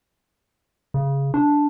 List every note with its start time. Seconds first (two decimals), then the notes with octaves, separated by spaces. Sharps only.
0.94 C#3
1.34 D4